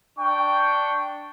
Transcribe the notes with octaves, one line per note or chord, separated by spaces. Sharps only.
D4 G5 C#6